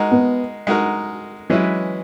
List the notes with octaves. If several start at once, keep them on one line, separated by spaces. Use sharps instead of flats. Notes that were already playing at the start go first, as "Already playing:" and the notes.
Already playing: G#3 D#4 F#4 A#4
B3
G#3 D#4 F#4 A#4
E3 F#3 G#3 C#4 E4 B4